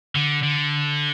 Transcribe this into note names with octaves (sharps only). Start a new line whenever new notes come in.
D3
D3